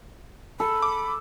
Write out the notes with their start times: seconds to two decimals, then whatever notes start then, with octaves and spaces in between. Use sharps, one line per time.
0.60 A4 B5
0.82 D6